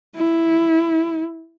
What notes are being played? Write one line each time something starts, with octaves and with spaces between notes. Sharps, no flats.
E4